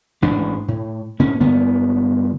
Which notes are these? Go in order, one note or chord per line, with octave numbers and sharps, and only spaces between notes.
A1 G#2 D4
A2
G#2 D3 A#3 C#4
G2 D3 A#3 B3